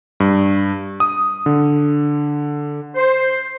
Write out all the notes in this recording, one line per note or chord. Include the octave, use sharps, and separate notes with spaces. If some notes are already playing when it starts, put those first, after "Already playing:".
G2
D#6
D3
C5